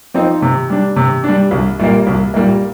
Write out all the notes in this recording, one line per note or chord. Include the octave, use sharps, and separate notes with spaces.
F3 C4 D#4
C3
G3 D4
C3
G3 D4
C2
A#2 G3 A#3
C2
A#2 G3 A#3